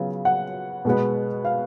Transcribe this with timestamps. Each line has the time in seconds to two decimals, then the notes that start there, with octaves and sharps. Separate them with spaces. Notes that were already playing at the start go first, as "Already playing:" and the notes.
Already playing: C#3 F#3 B3 F4
0.25 F#5
0.85 B2 G#3 B3
1.45 F5